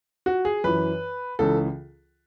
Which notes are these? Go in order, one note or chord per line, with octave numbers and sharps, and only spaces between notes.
F#4
G#4
F#2 E3 B4
C#2 C#3 E3 A4